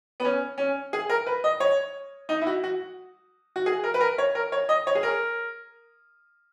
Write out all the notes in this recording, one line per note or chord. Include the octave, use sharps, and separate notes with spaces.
B3
C#4
C#4
G#4
A#4
B4
D#5
C#5
D#4
E4
F#4
F#4
F#4
G#4
A#4
B4
A#4
C#5
A#4
C#5
D#5
C#5
G#4
A#4